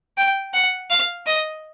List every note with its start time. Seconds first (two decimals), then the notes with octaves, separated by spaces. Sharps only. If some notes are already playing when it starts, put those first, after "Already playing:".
0.18 G5
0.54 F#5
0.90 F5
1.26 D#5